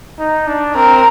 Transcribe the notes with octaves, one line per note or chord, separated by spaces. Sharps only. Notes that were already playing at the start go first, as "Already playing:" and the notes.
D#4
D4
C4 A#4